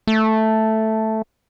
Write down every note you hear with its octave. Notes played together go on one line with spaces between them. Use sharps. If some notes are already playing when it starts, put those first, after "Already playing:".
A3